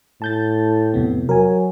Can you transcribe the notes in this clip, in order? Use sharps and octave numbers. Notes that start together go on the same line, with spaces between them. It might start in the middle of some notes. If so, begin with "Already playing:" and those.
A2 A5 G6 A6
F2 C3 B3
F#3 A#4 G#5